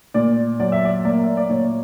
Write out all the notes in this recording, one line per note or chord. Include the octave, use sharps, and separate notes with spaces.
A#2 D5
F#3 D5
E5
D5
A#3 D5
E5
D5
A#2 C#5